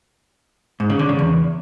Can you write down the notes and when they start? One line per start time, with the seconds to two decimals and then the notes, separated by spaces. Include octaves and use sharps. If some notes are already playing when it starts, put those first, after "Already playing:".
0.80 G#2
0.90 C#3
0.99 D3
1.09 C#3
1.19 E2